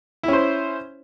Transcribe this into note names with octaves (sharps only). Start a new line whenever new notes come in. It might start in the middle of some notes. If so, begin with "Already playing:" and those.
C#4 E4 C5